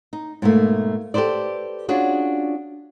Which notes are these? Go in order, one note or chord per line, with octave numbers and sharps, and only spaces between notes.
D#4
G#2 B2 G3 A3 A#3
G4 A4 B4 C5 D5
C#4 D4 F4 F#4 G#4